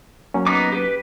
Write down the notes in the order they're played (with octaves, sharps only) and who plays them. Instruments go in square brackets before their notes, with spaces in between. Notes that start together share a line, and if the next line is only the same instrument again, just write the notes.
[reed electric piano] F#3 A#3 C#4
[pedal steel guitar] B3 D#4 D6
G4 B4